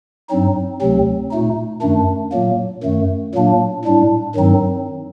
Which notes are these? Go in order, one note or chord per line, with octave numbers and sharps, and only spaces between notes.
G2 F#3 C4 D#4
D2 C3 F#3 C4
A#2 A3 D#4
F#2 D#3 A3 D4
A#2 F#3 A#3
F#2 D#3 A3
A#2 F#3 A#3 D4
A2 G3 D4
G2 D#3 F#3 C4 D#4